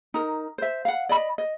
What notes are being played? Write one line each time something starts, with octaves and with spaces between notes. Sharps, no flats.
D#4 A#4
C5 E5
F5 F#5
D5 D#5 B5
D#5